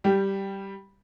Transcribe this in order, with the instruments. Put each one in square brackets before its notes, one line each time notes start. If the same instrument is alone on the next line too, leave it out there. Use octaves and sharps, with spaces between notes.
[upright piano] G3 G4